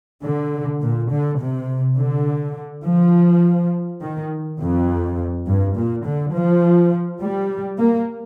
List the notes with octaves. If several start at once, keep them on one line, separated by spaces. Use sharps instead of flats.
D3
A#2
D3
C3
D3
F3
D#3
F2
G2
A#2
D3
F3
G3
A#3